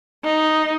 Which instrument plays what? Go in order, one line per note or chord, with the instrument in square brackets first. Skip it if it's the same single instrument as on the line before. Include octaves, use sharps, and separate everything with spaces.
[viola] D#4